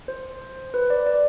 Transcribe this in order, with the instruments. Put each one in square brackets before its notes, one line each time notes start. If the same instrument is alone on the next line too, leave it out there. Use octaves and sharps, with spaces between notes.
[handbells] C5
B4
D5
D5